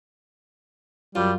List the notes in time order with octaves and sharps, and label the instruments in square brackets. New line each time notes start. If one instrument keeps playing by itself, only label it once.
[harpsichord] F#2 [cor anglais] G3 [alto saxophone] F4